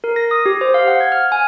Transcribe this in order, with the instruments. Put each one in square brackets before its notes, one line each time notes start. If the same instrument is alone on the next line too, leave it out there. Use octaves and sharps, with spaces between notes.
[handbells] A#4
A#6
D#6
G4
C5
F5
F#5
G#6
F6
G#5